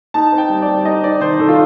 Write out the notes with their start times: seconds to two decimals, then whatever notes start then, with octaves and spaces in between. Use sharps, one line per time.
0.14 D#4 A5
0.32 C4
0.38 G5
0.50 G3
0.62 D5
0.68 G3
0.85 D#4 D#5
1.03 C4 D5
1.21 D#3 C5
1.39 D#3 A4
1.49 F4